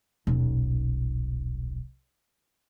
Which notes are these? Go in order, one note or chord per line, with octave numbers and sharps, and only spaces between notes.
D#1 B1